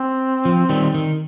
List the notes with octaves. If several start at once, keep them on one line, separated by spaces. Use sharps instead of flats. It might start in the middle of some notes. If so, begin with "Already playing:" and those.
Already playing: C4
F3
D#3 G3
D#3